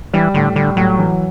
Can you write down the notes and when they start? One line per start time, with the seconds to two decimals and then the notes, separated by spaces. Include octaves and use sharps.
0.14 E3 G3
0.34 A2 D3
0.56 D3 G3
0.77 A2 F#3
0.99 E3